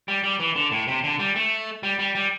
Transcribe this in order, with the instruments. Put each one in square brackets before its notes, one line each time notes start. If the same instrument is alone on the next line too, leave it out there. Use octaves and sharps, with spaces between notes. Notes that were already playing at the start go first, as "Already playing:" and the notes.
[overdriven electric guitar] G3
G3
E3
D3
A2
C3
D3
G3
A3
G3
G3
G3